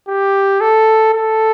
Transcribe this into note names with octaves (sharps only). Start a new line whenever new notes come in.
G4
A4
A4